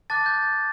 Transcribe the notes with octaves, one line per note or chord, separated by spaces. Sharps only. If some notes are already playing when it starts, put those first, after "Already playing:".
A5 D6 F#6 A6
G6
A6